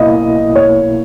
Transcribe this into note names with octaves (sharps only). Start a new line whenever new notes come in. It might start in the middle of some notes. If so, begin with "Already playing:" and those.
Already playing: B1 B2 A#3 E4 D#5
C#5